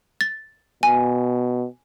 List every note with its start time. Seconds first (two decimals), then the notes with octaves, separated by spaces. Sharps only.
0.21 A6
0.83 B2 G#5